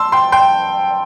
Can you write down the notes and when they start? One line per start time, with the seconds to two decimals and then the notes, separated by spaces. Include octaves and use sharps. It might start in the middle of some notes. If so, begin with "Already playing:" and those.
Already playing: A5 C6 E6
0.12 G5 C6
0.32 G5 C6